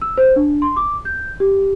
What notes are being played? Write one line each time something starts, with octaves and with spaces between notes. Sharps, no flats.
E6
C5
D4
C6
D6
G6
G4